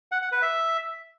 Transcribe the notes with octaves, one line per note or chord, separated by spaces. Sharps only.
F#5
F#5
B4
E5